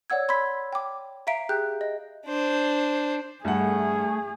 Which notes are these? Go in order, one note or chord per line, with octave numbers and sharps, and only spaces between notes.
C#5 D5 F#5 E6 G#6
B5 C6 E6 G#6 B6
G5 D6
E5 F5 A#5 B6 D7
G4 G#4 G5 F#6 G6
D#5
D4 C5
G2 A3 G#4 F#5